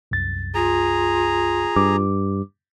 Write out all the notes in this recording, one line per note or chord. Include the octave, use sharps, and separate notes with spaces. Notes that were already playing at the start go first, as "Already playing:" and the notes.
C2 F#2 A6
F4 G#4 A#5
G2 D6